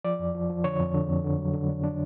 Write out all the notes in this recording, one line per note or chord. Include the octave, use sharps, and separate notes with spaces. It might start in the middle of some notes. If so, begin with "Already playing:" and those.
F3 D5
F2
F3
F3
D3 C#5
F2
D3
F2
D3
F#3
D3
D4
D4